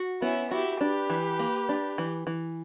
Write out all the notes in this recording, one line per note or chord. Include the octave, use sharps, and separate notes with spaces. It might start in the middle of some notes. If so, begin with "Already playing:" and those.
Already playing: F#4
B3 C#4 E4
E4 F#4 G4
D4 G4 B4
E3
A#3
D4
E3
E3